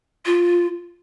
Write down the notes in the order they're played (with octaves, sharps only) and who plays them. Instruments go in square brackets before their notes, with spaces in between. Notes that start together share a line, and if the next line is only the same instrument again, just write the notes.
[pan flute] F4